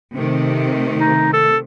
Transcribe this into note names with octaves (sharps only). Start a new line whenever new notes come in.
C3 D#3 A3
D#4
A4